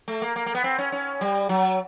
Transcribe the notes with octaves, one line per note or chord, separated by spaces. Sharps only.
A3
A#3
A#3
A#3
B3
C4
C#4
C#4
G3
F#3